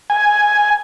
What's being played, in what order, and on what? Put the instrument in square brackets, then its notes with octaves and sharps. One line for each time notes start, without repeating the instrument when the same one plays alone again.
[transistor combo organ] G#5